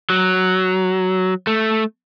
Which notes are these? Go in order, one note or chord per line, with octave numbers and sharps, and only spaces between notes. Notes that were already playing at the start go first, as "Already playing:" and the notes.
F#3
A3